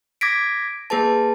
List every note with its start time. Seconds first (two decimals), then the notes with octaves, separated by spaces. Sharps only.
0.21 D6 G#6 A#6 B6 D7
0.90 A#3 G#4 B4 A5